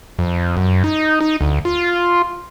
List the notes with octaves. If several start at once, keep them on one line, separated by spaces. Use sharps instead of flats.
F2
F#2
D#4
D#4
D2
F4